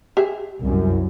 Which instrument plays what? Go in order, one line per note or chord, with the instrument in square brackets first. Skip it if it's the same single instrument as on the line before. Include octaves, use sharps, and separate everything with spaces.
[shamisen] G4 G#4 E5
[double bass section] C2 F#2